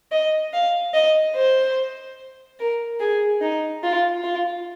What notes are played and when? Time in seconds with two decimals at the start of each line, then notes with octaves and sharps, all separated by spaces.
0.12 D#5
0.53 F5
0.94 D#5
1.35 C5
2.59 A#4
3.00 G#4
3.41 D#4
3.83 F4
4.24 F4